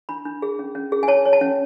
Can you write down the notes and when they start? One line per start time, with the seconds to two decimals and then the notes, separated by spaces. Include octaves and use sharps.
0.09 D4 B5
0.25 D4
0.42 G#4
0.59 C#4
0.75 C#4
0.92 G#4
1.03 G#5
1.08 C#5 A5
1.25 C#5
1.33 A5
1.41 C#4